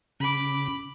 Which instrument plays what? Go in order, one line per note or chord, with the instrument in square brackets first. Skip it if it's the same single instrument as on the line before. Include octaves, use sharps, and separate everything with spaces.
[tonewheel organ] C#3 [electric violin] B5 D6